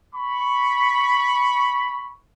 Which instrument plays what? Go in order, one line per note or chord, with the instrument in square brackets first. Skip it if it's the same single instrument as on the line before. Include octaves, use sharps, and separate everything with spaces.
[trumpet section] B5 C#6